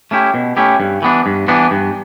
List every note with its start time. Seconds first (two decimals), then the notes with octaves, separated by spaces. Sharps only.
0.11 A3 C#4 E4 G4
0.34 B2
0.57 A3 C#4 E4 G4
0.80 G2
1.02 E3 B3 D4
1.26 G2
1.48 E3 B3 D4
1.71 G2